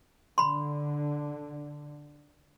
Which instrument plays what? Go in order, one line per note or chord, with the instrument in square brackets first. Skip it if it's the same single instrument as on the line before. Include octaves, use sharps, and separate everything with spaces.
[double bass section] D3 [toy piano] B5 C6